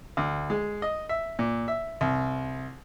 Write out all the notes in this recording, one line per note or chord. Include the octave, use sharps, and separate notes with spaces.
D2
G#3
D#5
E5
A#2
E5
C2